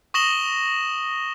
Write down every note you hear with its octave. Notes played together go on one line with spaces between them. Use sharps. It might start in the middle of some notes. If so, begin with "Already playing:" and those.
C#6 D#6 A#6 E7 F#7 G7